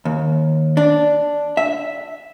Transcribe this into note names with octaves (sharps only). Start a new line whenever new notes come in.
D#2
D4
E5